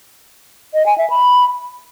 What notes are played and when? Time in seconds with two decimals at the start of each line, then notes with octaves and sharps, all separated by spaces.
0.74 D#5
0.86 G#5
0.98 E5
1.10 B5